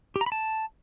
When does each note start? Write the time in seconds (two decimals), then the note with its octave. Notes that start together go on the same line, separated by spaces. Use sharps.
0.16 G4
0.21 A#5
0.26 B5
0.32 A5